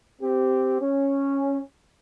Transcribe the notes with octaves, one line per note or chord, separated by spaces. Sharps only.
C4 G4
C#4